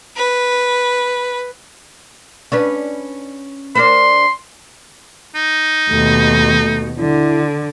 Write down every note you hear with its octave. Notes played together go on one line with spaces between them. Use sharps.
B4
C#4 D4 B4
D4 A#4 C5 C6
D#4
D#2 B2 A3
D3 E4